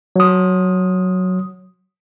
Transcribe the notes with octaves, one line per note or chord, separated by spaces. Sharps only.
F#3 D#6